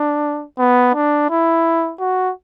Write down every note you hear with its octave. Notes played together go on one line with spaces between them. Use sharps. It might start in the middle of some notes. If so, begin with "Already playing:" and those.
Already playing: D4
B3
D4
E4
F#4